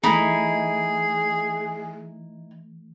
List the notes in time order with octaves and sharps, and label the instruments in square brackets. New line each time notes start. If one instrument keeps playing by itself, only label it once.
[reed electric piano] E3 A3 [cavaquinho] D#4 E4 [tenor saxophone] G#4